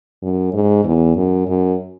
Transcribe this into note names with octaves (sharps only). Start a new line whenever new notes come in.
F#2
G#2
E2
F#2
F#2